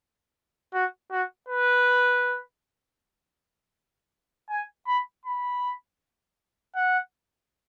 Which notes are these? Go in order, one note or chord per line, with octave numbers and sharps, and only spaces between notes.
F#4
F#4
B4
G#5
B5
B5
F#5